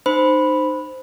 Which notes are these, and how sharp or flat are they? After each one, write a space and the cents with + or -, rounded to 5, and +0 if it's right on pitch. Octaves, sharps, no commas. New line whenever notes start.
D#4 -30 C5 -10 B5 +0